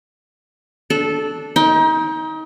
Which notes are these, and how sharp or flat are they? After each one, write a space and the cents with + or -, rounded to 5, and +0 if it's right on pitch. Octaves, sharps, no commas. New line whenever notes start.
D4 +0 A4 -15
D#4 +30 G5 +0